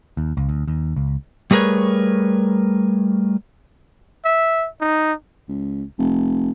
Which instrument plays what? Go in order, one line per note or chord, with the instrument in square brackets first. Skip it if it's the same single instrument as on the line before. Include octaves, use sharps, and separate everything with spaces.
[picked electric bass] D#2
C#2
D2
D#2
C#2
[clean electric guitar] G3 A3 G#4 A#4 B4 C#5
[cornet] E5
D#4
[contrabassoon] C#2
F1